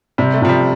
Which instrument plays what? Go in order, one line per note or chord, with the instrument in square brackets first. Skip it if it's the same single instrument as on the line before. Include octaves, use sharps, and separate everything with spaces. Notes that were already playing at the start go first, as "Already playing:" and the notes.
[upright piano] C3 [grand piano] G3
[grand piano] A3
[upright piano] C3 [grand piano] F3
[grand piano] G3